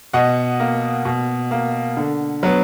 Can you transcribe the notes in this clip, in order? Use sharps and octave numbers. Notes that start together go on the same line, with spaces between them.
B2 D#5 F#5
A#3
B2
A#3
D3
F#3 B3